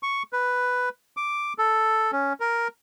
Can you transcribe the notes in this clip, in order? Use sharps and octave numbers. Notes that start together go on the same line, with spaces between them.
C#6
B4
D6
A4
C#4
A#4